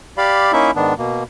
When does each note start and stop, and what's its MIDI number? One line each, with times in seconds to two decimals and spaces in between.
0.18 0.52 67
0.18 0.52 74
0.18 0.52 77
0.18 0.52 83
0.52 0.71 58
0.52 0.71 61
0.52 0.71 63
0.52 0.71 64
0.52 0.71 76
0.75 0.94 44
0.75 0.94 51
0.75 0.94 59
0.75 0.94 62
0.98 1.23 47
0.98 1.23 58